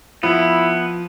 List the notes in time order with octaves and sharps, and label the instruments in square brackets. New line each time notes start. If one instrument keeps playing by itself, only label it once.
[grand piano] F3 [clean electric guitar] B3 [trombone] E4